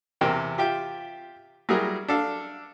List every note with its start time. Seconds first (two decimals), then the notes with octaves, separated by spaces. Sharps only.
0.21 E2 C3 A#4 E5 G5
0.58 F4 G4 E5 G5
1.69 F#3 G3 E4 G#4 A#4
2.08 D4 A4 F5